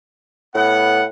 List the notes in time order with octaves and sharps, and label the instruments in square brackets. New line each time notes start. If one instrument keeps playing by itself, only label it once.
[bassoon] A2 [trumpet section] B3 F#5